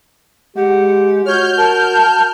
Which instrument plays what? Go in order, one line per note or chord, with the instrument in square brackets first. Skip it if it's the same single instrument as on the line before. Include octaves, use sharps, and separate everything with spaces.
[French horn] G#3 [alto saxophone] G4 [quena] F#5
[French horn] F#4 [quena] C#5 [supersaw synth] F6 G6
[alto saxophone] A#4 [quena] A5